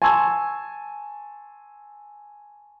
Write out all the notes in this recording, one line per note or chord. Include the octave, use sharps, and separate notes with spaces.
G#5 A5 C6 C#6 E6 G#6